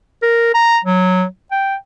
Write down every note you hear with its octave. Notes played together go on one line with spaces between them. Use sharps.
A#4
A#5
F#3
G5